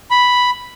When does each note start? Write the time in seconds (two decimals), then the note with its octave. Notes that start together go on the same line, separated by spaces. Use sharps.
0.11 B5